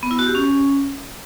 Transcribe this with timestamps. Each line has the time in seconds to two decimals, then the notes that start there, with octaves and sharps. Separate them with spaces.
0.03 B3
0.11 E4
0.19 F#4
0.27 G4
0.35 C#4